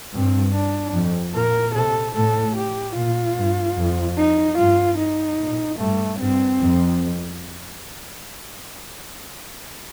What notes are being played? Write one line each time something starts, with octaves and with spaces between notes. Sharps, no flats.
G2 C4
D4
F2
A#2 A#4
C3 A4
A2 A4
G4
A#2 F4
G2
F2
D#4
G2 F4
D#4
A#2
G2 A3
G2 C4
F2